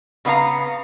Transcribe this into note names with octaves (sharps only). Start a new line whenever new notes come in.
C#3 B3 E4 F5 A#5